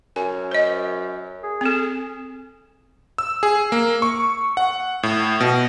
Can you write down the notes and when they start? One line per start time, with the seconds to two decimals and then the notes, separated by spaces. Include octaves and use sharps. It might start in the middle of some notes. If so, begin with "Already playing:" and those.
0.16 F#2 G#5
0.51 C5 D#5
1.43 G#4
1.61 C4 A4
3.18 E6
3.43 G#4
3.72 A#3
4.02 C#6
4.57 F#5
5.03 A2
5.40 B2